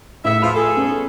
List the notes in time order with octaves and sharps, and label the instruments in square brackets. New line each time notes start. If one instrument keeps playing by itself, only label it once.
[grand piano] A2 [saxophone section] C#3 B3 E5
[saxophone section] F3 B3 F4 [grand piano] B5
[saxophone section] G#4 A4
[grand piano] B3 C#4